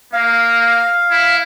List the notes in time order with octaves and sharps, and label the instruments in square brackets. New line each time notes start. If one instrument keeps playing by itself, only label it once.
[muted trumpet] A#3 [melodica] F5
[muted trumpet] E4